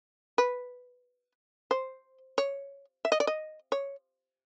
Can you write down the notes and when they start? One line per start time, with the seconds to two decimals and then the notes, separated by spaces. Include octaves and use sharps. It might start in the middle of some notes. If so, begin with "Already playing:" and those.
0.38 B4
1.71 C5
2.38 C#5
3.05 E5
3.12 D#5
3.20 D5
3.27 D#5
3.72 C#5